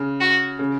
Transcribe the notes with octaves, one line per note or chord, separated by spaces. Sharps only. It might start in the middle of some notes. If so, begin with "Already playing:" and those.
Already playing: C#3
F#4
C#3